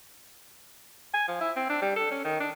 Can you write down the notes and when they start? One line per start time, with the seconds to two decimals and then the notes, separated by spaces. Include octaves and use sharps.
1.14 G#5
1.28 F3
1.40 E4
1.56 C4
1.69 D4
1.82 G3
1.96 A4
2.11 C#4
2.25 D#3
2.40 D4